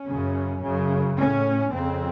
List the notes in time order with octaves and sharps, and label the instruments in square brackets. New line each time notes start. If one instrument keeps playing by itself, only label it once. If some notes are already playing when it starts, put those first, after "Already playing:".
Already playing: [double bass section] C#4
F#2 C#3
F#2 C#3
A2 C#4
F2 C#3 C4